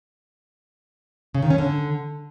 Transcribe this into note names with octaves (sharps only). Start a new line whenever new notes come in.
C#3
D#3
C#4
D3